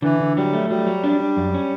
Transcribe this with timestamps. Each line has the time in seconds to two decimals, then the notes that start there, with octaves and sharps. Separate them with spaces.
0.02 D3 E3
0.20 D3
0.36 F#3 G3
0.53 A3
0.69 F#3 G3
0.86 F#3
1.04 D4
1.20 D4
1.37 F#2
1.54 C#4